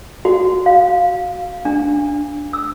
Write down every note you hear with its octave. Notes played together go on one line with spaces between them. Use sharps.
F#4
F5
D4
E6